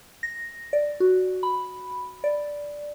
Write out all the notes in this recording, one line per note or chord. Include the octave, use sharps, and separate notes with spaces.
A#6
D5
F#4
B5
D5